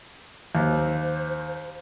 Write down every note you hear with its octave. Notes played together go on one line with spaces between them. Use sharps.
D#2 C5